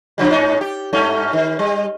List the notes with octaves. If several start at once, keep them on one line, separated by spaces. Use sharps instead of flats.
C#3 F3 G3
G#2 C#4 D#4
G4
G2 A3 C#4
D#3
G3